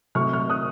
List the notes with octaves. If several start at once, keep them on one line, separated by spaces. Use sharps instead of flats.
C3 F#3 A3 C#6 F6
C#6 F6
D#6 F#6